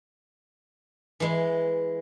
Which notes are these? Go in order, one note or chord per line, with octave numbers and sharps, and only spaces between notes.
E3 G#3